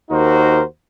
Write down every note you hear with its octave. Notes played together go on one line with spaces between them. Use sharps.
D#2 D#4 F#4 A#4 C5